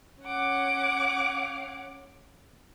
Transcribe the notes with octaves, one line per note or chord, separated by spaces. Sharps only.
C#4 F#5 D6